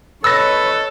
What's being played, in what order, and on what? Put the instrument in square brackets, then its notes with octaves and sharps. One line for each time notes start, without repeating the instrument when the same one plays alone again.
[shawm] A4 [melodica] B4 [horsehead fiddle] C#5 D#5 [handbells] E6 A#6